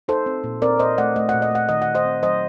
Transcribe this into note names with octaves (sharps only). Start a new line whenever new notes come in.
D#4 A4 C5
C4
A#2
C4 A#4 D5
A#2 C5 D#5
A3 D5 F#5
A3 D#5
A#2 F#5
D#5
A3 F#5
D#3 D#5
F#5
D#3
C5 D#5
C4
F#3 C5 D#5